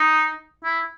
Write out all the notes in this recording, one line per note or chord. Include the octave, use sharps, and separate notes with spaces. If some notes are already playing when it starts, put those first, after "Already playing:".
Already playing: D#4
E4